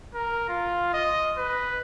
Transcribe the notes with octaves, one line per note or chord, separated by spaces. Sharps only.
A#4
F4
D#5
B4